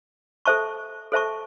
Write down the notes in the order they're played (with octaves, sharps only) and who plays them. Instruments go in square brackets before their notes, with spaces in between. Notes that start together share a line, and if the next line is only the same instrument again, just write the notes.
[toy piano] A4 C5 E5 A5 C#6
A4 C5 E5 A5 C#6